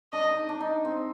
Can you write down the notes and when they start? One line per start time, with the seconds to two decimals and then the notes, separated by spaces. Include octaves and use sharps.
0.13 D4 D#5
0.24 D4
0.31 D#4
0.49 D4
0.61 D#4
0.85 C4